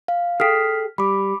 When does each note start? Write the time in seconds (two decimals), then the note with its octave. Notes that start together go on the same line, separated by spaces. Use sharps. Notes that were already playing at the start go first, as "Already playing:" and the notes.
0.08 F5
0.40 G#4 A4 G5 F6 B6
0.98 G3 B5 D6